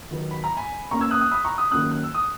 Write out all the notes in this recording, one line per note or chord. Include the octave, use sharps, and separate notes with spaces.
D#3 F#3 B3
B5
A#5
G#5 B5
B2 A#3 C#4 A#5 C#6
E6 G#6
D#6 F#6
D#6 F#6
B5 D#6
A#5 C#6
B5 D#6
D#3 F#3 A#3 C#4 D#6 F#6
F#6
E6
D#6